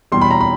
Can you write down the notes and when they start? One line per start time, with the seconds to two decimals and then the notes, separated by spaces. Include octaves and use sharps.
0.12 E2 B2 G3 C6
0.21 B5
0.31 A#5
0.41 B5